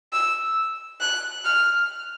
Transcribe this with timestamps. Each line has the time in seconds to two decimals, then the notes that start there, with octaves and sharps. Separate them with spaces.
0.13 E6
1.01 F#6
1.45 F6